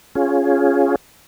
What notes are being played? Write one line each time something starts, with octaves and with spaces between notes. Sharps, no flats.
C#4 F4 G#4